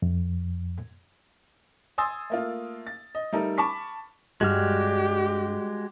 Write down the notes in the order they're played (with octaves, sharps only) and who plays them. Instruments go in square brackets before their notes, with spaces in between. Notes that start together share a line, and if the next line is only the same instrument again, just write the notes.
[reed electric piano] F2
[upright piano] G#5 C6 D#6 E6 A6
A3 A#3 F4
A6
D#5
G3 A3 D#4 A4 A#4
A5 B5 C#6 D6 B6
[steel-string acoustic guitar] G2 [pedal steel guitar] G#3 F#4 F6 [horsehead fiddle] G4